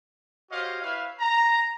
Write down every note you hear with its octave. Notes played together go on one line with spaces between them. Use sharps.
F#4 G4 C5 C#5 D#5 F5
E4 B4 C#5 E5 F5
A#5